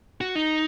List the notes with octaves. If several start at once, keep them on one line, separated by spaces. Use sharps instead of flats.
F#4
D#4